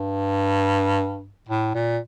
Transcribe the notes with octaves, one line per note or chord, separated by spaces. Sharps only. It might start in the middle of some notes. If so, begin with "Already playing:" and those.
Already playing: G2
A2
A#2